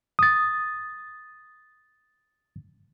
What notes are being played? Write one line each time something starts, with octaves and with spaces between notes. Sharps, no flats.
D#6 A6